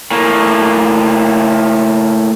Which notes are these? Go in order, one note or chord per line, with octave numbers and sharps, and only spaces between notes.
A2 A#3